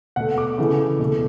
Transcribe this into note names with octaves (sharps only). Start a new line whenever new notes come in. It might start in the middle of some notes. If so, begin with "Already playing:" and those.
B2 A3 F#5
D6
C#3 E3 A3
B2 A3